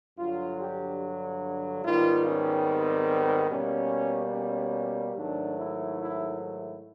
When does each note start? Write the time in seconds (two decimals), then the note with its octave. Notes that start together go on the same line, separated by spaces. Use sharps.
0.17 G2 D3 F#3 F4
0.59 G4
1.83 G#2 D#3 G3 B3 F4
2.25 C#4
2.67 C4
3.49 B2 G3 A#3 C#4
4.33 C#4
5.16 G#2 D#3 F#3 A3 D4
5.58 E4
5.99 E4
6.40 E4